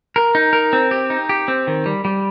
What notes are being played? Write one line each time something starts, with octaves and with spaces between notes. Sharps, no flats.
A#4
D#4
A#4
C4
G4
D#4
G4
C4
D#3
G3
G3